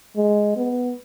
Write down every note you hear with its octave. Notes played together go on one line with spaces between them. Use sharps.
G#3
B3